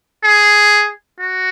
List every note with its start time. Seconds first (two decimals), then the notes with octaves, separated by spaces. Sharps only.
0.24 G#4
1.20 F#4